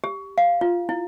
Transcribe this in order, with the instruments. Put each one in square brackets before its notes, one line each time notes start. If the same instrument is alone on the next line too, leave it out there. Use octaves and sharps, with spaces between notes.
[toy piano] G4
F5
F4
E4